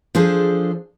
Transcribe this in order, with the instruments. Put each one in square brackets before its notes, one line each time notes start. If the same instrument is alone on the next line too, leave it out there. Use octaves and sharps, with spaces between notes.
[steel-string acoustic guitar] F3 D4 G#4 A4 C5